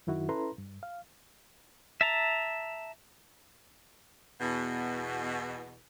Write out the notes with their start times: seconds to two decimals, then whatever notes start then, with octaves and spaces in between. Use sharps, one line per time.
0.07 F#2 D#3 E4 F#4
0.29 C#4 E4 A4 B4 A#5 C6
0.58 G2
0.83 F5
2.01 E5 A5 A#5
4.40 E2 B2